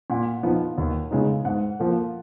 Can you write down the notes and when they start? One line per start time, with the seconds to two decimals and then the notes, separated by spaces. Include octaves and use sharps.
0.10 A#2 F#5
0.43 F3 B3 D#4
0.78 D#2
1.11 C#3 G#3 B3 D#4
1.45 G#2 F#5
1.80 F3 A#3